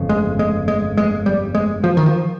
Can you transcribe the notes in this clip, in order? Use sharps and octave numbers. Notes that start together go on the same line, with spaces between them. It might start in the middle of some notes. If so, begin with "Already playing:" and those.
Already playing: G1 F2 C#3
G#3
G#3
G#3
G#3
G3
G#3
F3
D#3
F3